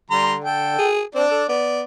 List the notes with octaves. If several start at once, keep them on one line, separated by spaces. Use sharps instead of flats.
D3 G3 A#5 C6
A4 G5
G#4
C4 D4 D5
A4
B3 D5